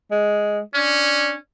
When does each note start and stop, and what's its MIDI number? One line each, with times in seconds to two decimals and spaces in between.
0.11 0.60 56
0.74 1.34 61
0.74 1.36 62